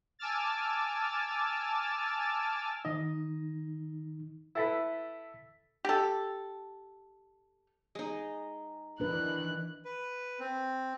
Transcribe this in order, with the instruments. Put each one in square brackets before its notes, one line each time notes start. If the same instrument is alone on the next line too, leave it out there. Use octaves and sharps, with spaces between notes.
[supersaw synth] G#5 A5 D6 E6 F6 A6
[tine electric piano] D#3 D#4 [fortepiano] D#5
[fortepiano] E4 A4 B4 [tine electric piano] E6 A6 B6
[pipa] G4 A4
[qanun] G#3 D#4
[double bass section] D#3 E3 [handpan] D4 B4 [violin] F#6
[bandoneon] B4
C4